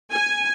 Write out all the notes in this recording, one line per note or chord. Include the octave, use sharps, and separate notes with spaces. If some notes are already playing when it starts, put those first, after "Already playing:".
G#5